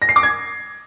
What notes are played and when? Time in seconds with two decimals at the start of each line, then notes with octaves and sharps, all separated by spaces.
0.02 A#6
0.09 C7
0.16 D6
0.23 G#6